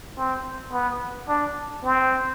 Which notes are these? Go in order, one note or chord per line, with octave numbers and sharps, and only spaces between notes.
C4
B3
D4
C4